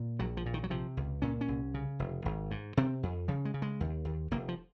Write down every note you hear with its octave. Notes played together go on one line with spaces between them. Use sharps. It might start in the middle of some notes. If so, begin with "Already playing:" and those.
Already playing: A#2
A#1 F#3
F3
A#2
D#3
F#3
C3 F3
C#2
A#2 C#4
C#4
C2
C#3
F1
G#1
G#2
C3 C4
F2
C#3 F3
G#3
C#3
G#3
D#2
D#2
F1 A#3
F3